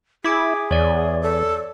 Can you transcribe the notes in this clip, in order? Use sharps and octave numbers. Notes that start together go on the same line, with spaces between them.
E4 G#4 D6 G#6 B6
E2 C#5 D5
A4